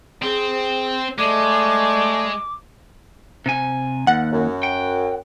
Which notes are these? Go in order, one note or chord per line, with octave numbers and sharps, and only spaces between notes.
C4 G#4
G#3 A3 D5 D6
C3 G#5
D#2 F#5
F#2
G5